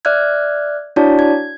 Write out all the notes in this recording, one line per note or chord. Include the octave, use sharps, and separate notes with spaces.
D5 E5 F6 F#6 G#6
D4 E4 F#4 C#5 D5 A5
G#6